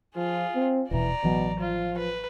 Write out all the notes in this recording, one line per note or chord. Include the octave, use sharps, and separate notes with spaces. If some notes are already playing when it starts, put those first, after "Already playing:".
F3 F4 G#4
C4
D#1 B2 E3 D5 A#5
A1 B2 E3 F#3
F3 F4
B4